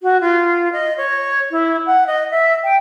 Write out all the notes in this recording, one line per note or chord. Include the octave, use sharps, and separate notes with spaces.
F#4
F4
D#5
C#5
E4
F#5
D#5
E5
G5